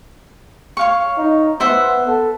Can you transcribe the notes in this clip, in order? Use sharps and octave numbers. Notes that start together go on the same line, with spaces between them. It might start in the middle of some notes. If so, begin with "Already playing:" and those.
C#5 F5 C#6
D#4
B3 C5 E5 F#5
A4